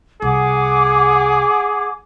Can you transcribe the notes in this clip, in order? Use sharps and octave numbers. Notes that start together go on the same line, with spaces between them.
C2 G#4 F#5 D6